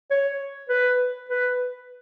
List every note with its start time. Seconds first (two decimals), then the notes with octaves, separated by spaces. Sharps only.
0.11 C#5
0.69 B4
1.29 B4